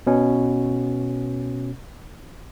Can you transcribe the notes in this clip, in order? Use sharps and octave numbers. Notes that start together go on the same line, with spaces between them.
B2 C#4